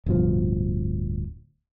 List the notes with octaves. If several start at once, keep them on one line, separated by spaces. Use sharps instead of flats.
D1 G2 B2 F3